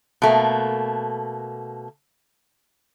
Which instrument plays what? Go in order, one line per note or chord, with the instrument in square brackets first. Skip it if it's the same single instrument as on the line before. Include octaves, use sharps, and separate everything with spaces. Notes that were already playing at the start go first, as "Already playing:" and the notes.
[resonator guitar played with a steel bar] B2 A3 A#3